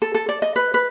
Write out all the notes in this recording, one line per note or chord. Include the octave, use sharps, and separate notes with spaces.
A4
A4
D5
D#5
B4
B4